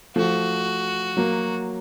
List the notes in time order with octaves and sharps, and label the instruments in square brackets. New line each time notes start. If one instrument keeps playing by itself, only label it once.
[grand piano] F3 A3 [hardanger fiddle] F#4
[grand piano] F#3 A#3